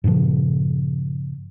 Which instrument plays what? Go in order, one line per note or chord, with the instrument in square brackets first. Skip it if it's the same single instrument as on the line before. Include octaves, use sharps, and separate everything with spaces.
[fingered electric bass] G2 A#2 C#3 F3